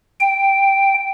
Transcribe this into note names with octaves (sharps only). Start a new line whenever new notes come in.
G5